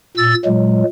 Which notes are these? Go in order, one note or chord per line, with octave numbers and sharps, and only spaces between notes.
A#2 E6 A6
A#2 F#3 G#3